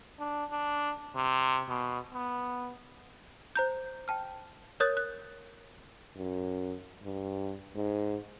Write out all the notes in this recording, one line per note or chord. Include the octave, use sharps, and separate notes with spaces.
D4
D4
C3
B2
B3
C5 A#5 G6
G5 A5 F6
A#4 C#5 D#6 F#6 G6 A6
F#6
F#2
G2
G#2